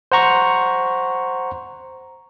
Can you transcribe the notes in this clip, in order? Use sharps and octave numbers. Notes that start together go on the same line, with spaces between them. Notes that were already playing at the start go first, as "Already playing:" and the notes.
C5 F#5 A#5 C#6